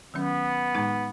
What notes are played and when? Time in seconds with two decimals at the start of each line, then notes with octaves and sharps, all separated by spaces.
0.14 D#3 F#3 B3 C#4
0.75 A2 G#3 D#4